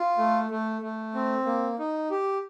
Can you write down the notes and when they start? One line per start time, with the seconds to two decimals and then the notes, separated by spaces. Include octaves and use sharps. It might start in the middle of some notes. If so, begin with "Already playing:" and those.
Already playing: F4
0.18 A3
0.51 A3
0.82 A3
1.15 C4
1.46 A#3
1.79 D#4
2.11 G4